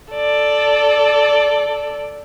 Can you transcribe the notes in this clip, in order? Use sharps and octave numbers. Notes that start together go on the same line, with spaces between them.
A4 D5